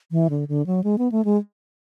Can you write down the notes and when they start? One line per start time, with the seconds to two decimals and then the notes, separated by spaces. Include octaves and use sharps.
0.11 E3
0.30 D3
0.48 D3
0.66 F#3
0.84 G#3
0.98 B3
1.12 A3
1.25 G#3